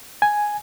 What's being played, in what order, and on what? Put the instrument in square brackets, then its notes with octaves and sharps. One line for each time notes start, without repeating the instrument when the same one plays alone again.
[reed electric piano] G#5